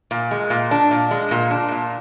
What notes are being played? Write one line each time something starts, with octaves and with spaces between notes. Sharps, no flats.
A#2
G#3
A#2
D4
A#2
G#3
A#2
D4
A#2